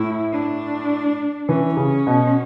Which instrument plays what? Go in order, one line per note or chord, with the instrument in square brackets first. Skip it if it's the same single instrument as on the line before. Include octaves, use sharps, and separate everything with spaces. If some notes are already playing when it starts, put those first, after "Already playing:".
Already playing: [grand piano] A2 [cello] E4
[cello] D4
[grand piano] E3 [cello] C#4
[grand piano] C#3
B2